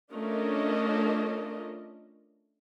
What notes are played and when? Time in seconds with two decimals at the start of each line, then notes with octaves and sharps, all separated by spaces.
0.11 A3 C#4 D4 F4 A#4 D#5